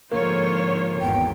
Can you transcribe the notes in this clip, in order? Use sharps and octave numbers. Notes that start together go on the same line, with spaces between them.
G#2 D3 F3 A#3 F4 C5 C#5
G#1 E2 B3 G5